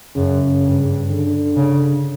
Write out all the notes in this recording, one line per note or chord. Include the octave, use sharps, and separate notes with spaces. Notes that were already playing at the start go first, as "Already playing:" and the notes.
F#2 C#3
G2
D3
C#3